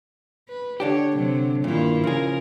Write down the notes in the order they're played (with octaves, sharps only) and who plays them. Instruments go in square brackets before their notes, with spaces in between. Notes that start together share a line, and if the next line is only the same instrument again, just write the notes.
[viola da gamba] B4
[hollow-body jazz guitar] D3 D4 G4 [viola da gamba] C#5
[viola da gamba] C3 F#3
[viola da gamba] G2 E4 F4 [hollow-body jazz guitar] A#2 D#3
[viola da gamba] C#3 A#4 [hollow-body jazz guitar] F3 G#4